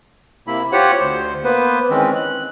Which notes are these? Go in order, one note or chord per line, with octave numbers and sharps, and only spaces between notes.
C3 A#3 E4 B5
F4 G4 C5 C#5 F#5
D2 C5
A#3 B3 B4 C5
D#3 E3 G#3 C4 C#4
F#6